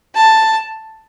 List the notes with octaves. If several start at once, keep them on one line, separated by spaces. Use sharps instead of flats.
A5